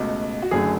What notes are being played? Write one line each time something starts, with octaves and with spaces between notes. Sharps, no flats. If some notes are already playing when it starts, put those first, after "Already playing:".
Already playing: C#2 B2 A3 F#4
F#4
F#1 F#2 D3 A3 G#4